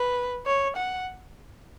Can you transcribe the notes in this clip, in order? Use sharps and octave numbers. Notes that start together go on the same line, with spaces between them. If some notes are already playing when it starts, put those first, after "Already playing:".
Already playing: B4
C#5
F#5